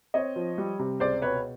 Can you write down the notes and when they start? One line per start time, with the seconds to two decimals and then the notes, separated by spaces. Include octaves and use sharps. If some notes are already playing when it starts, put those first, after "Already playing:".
0.14 C4 C#5 D#5
0.36 F3
0.58 G3
0.79 C3
1.00 C#2 C5 D5
1.22 B2 B4 C#5